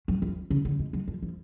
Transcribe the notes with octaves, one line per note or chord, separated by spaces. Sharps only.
F#3
F3
C#3
D3
G#3
F#3
F3
F3